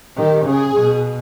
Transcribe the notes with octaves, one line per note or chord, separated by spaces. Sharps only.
D#3 G4
C#3 G#4
B2 G#4